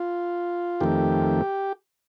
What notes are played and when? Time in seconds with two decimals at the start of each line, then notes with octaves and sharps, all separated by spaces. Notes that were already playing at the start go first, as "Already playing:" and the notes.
Already playing: F4
0.81 F2 D#3 A3 G4